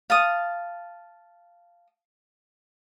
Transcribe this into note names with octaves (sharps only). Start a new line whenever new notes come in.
F5 A5 D#6